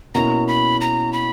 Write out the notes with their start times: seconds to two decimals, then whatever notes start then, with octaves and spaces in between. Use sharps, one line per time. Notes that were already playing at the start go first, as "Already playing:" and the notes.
0.15 B2 A#3 C#4 E4 A#5
0.48 B5
0.81 A#5
1.13 B5